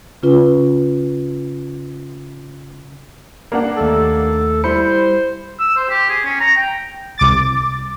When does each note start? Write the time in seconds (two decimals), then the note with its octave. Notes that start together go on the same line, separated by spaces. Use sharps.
0.23 C#3 C#4 F4 B4
3.52 A#3 D4 F#5
3.77 D#2 A3 A4 A5
4.64 G3 E4 C5 B5 C#7
5.60 E6
5.76 C5
5.90 G4
6.09 G#4
6.25 C#4
6.40 A#5
6.57 G5
7.18 C2 D6 A6